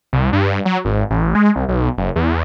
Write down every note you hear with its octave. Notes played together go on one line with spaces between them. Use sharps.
C2
G2
F#3
G#1
A1
G#3
C2
B1
F#1
E2